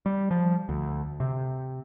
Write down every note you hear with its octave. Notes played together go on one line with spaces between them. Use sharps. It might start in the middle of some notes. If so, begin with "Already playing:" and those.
G3
F3
D2
C3